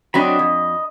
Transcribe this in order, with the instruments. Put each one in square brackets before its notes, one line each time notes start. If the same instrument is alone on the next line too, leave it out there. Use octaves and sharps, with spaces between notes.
[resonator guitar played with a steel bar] F#3 C4 D4 [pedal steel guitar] D#5 B5
[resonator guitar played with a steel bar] F2